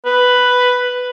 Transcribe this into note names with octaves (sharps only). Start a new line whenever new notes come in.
B4